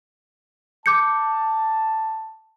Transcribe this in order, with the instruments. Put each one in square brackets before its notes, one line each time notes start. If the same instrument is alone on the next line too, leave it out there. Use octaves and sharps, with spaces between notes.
[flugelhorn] A5 [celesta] D6 G6 C#7